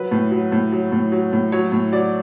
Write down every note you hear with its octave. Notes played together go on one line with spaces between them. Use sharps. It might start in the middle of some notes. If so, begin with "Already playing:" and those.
Already playing: F#3 B4
A2
F#3
A2
F#3
A2
F#3
A2
F#3 C#5
A2
F#3 D5